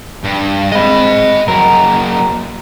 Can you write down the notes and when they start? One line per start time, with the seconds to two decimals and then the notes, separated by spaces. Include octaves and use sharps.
0.24 G2
0.72 G#3 C4 D#5 B5
1.48 F#3 A#3 A#4